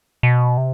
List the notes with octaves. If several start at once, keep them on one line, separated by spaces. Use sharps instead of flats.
B2
C3